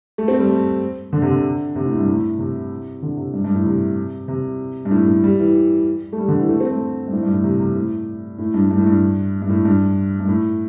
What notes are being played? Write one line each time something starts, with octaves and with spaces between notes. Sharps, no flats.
A3
C4
G3
A3
D3
C3
D3
C3
A2
G2
A2
C3
D3
C3
G2
G2
A2
C3
C3
G2
A2
A2
G3
E3
A3
G3
D3
E3
A3
C4
A3
G2
A2
G2
A2
C3
C3
A2
A2
G2
G2
A2
G2
G2
A2
G2
G2
A2